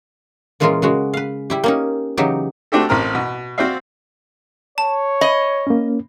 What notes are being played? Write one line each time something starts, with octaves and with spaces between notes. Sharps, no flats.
A#2 E3 G#3 C#4 F4 A#4
C#3 G#3 F#4
B4 F5
G3 E4 G4
A#3 C#4 D#4
C#3 E3 F#3 D#4 G4
A3 C4 D4 F#4 G4 A4
A1 C4 A#4 F6
B2
C4 F#4 C5 D5 E5 F5
C#5 A5
D#5 B5
A#3 C#4